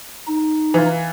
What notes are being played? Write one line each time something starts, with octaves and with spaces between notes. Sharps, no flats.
D#4
E3 F4